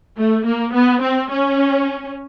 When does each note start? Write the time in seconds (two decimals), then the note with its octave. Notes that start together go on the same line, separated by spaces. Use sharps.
0.17 A3
0.46 A#3
0.74 B3
1.02 C4
1.31 C#4